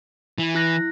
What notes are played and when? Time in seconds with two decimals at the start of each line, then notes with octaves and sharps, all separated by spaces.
0.38 E3
0.55 E4 F#6 A#6